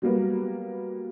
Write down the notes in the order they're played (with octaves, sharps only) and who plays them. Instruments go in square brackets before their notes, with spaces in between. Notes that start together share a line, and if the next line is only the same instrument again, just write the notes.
[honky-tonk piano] F#3 G3 A#3 B3